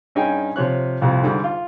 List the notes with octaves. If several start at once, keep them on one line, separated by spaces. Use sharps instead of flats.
G2 C#4 D#4 G#4 G5 G#5
C3 F3 C#5 F#6
C2 F2 A2 C3
G#2 D3 G3
F4